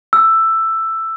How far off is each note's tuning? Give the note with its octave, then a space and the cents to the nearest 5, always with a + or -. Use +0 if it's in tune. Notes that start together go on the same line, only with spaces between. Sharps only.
E6 +10